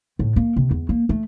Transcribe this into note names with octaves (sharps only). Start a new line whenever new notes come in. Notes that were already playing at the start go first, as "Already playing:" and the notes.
A2
A#3
C3
E2
A#3
A3